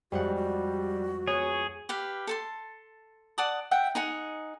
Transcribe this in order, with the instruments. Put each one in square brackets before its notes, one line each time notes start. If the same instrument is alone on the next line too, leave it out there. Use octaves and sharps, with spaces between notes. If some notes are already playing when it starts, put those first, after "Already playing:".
[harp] F2 G#3 F#5 [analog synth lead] G3 [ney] F#4
[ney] F#4
[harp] B3 [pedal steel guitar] G#4 [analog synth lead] C#5
[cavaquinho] G4 B4 F5
A4 A5 C6
D5 F#5 A5 D#6
E5 F#5 G5
D#4 G#4 F#5